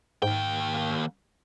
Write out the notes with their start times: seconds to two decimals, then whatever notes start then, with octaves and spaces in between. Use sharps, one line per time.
0.22 D#2 G#2 G5